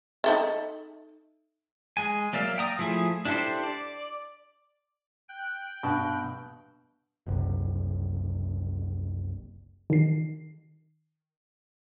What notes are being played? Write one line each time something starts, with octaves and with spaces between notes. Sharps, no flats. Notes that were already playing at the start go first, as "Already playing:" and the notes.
D#4 A4 E5
G#3 G#5
F#3 A#3 D5 E5 F5
G5 A#5 D#6
F3 A3 E4 G#4
D4 E4 G4 A4 C5
D5
G5 F#6
G2 B2
F#1 C2
D#3 C7